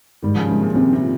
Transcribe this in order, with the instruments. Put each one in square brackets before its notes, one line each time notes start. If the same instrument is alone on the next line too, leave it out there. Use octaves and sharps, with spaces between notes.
[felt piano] G#2 [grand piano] D#3 G3
[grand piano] C#3 F3
[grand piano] C3 D#3 [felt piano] G#3
[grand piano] A#2 C#3
[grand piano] C3 [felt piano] C4
[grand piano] C3
[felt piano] F3